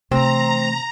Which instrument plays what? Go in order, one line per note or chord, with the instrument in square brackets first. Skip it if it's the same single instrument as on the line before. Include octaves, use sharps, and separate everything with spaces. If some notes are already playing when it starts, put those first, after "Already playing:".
[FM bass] C3 [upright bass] E3 A3 [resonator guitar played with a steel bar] C4 [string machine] A#5